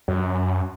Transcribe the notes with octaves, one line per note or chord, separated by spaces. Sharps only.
F#2